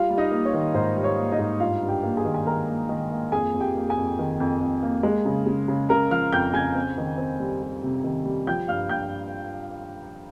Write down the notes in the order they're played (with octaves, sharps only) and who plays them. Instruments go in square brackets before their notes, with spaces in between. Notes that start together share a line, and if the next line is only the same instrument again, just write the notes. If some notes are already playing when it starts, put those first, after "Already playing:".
Already playing: [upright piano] G3 F4 F5
G3
D#4 D#5
A#3
C#5
D#3
G#2 C5
G3
C#5
A#3
D#4 D#5
G#2
G2 F4 F5
G2
G4 G5
A#3
G#4 G#5
D#3
G#5
D#3 A#4 A#5
A#3
D#3
A#3
F2 G#4 G#5
F2
G4 G5
A#3
G#4 G#5
F2
D#3
F2
F2
A#3
G#3
C#3
C#3
C#3
C#3 A#4 A#5
F3 F5 F6
F2 G5 G6
C#3 G#5 G#6
C4
D#3
C4
G3
G3
C3
D#3
G3
F3 G5 G6
G2 F5 F6
G2 G5 G6